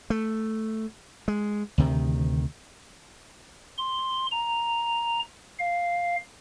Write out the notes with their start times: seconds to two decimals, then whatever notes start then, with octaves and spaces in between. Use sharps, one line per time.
0.10 A3
1.28 G#3
1.78 D2 C3 D#3
3.78 C6
4.31 A#5
5.59 F5